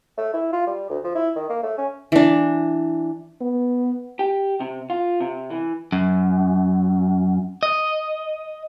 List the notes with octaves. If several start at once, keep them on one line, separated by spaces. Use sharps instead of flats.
A3
E4
F4
G3
D2
F3
E4
D#3
A#3
A3
C#4
E3 D4
B3
G4
C3
F4
C3
E3
F#2
D#5